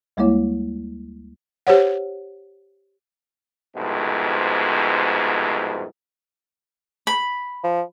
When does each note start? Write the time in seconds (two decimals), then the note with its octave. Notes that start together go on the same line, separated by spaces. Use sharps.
0.17 D2 G3 G#3 A#3 E4 C#5
1.67 G4 C5 C#5 F#5
3.76 C2 F2 G#2 B2
7.07 B5
7.64 F3